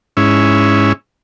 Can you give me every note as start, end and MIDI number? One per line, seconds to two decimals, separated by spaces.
0.17 0.93 44
0.17 0.93 61
0.17 0.93 64